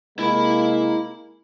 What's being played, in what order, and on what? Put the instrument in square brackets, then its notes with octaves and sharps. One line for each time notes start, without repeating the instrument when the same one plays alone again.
[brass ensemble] C3 G#3 A#3 [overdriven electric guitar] E4 B5